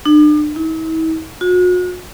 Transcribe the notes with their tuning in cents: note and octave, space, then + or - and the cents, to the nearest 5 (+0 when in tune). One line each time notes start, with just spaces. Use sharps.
D4 +40
E4 -45
F#4 -40